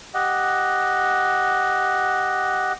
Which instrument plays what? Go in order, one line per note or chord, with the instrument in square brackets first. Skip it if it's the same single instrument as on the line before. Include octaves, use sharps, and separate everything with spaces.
[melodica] G4 D#5 F#5